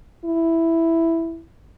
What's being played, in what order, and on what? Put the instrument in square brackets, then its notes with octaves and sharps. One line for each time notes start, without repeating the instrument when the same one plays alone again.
[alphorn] E4